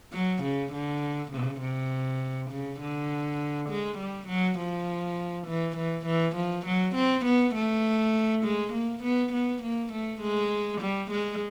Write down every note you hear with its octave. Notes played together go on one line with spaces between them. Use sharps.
F#3
C#3
D3
C#3
C3
C#3
D3
G#3
G3
F#3
F3
E3
E3
E3
F3
F#3
C4
B3
A3
G#3
A#3
B3
B3
A#3
A3
G#3
G3
G#3